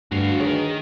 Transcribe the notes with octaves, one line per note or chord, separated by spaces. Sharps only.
D2 G2 F#4 F5
D#3 G#4 A#4 B4 C#5